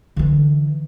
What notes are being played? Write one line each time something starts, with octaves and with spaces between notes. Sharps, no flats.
D3 E3